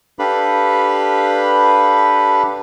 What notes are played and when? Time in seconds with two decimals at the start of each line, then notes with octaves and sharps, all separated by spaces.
0.19 D4 G4 A4 B4 F5 B5